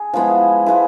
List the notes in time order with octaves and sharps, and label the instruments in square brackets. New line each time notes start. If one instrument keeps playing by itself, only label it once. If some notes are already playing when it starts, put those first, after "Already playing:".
Already playing: [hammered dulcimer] G#4
F3 G#3 B3 E4
F3 G#3 B3 E4